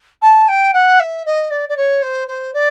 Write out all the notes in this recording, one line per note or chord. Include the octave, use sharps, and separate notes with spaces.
A5
G5
F#5
E5
D#5
D5
D5
C#5
C5
C5
D5